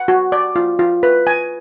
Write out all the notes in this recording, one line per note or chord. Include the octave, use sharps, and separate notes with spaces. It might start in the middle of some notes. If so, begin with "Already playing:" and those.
Already playing: F#5
F#4
D5
F4
F4
B4
G#5